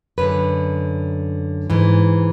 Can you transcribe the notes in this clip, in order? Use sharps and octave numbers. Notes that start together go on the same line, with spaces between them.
F#2 D3 B4
G#2 E3